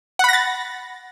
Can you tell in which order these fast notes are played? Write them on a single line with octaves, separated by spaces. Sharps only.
F#5 B5 A#6 A6